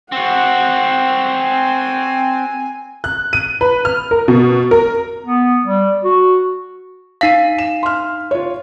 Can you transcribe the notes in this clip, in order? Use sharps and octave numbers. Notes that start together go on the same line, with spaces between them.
C4 F#4 F#5
G#5
F#6
D#7
B4
F6
A#4
B2
A#4
B3
G3
F#4
D#4 F5 B6 C7 D#7
E7
C6 F6
F4 C#5